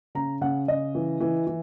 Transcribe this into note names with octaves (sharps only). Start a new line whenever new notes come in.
C#3 A#5
C#3 F#5
C#3 D#5
E3
E3
E3